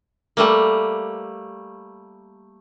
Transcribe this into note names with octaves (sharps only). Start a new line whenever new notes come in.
G3 A3 A#3